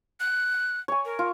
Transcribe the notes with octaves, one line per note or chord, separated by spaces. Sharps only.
F#6
C#5 G#5
A#4
F4